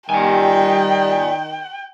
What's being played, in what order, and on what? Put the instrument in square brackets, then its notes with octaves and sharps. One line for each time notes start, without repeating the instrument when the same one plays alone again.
[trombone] D#3 [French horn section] G3 [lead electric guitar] D5 G#5 [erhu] G5